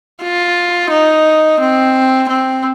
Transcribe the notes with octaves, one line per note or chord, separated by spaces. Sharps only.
F4
D#4
C4
C4